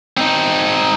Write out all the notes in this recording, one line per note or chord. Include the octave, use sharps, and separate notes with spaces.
C4 D#4